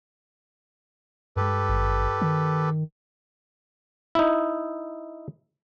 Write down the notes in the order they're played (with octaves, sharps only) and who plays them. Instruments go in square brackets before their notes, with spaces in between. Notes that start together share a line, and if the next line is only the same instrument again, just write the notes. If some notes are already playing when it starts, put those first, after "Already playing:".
[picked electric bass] G2 G#3 [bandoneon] G4 A4 B4
[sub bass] G#1
D#3
[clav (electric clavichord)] D#4 E4